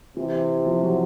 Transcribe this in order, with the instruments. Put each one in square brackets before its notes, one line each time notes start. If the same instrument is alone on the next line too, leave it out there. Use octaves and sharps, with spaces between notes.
[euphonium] C3 [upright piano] E3
[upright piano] F3
F#3